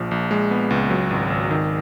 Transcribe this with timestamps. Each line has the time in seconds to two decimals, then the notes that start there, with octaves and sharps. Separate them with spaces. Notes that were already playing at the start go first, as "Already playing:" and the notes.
Already playing: A#1 F3
0.11 A#1
0.31 G#3
0.51 B3
0.70 C#2
0.90 F#3
1.11 G#1
1.30 G#1
1.51 D#3